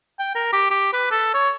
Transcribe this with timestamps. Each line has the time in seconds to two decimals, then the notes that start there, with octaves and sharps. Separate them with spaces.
0.19 G5
0.35 A#4
0.53 G4
0.71 G4
0.93 B4
1.11 A4
1.34 C#5